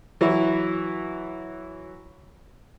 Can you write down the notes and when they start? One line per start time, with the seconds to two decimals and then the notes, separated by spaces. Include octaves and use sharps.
0.21 E3 F#3 E4